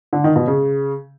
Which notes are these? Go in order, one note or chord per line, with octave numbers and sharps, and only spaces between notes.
D3
D#3
B2
C#3